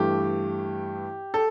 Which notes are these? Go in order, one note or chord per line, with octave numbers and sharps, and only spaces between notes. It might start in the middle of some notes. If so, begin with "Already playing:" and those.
Already playing: G2 E3 A3 G4
A4